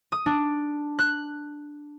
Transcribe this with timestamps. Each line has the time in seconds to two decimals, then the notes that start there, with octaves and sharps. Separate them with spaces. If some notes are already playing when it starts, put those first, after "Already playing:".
0.12 D#6
0.26 D4
0.99 F#6